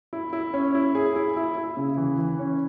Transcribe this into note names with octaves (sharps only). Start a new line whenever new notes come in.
E4
E4
C#4
E4
G#4
E4
E4
E4
C#3
E3
E3
C#4